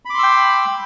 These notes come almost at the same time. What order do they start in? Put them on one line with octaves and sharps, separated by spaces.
B5 D6 C6 E6 G5